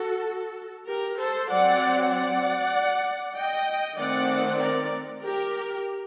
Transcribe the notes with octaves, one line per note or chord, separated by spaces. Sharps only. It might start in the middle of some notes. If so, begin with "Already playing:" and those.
Already playing: F#4 A4
G4 A#4
A4 C5
F#3 C4 D5 F#5
D5 F#5
D#5 G5
D#3 A3 C4 D5 F#5
A#4 D5
G4 A#4